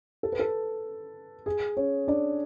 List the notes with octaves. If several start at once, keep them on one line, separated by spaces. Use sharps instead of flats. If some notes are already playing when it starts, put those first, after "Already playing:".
A4
B4
A4
G#4
C#4 C#5
D4 D5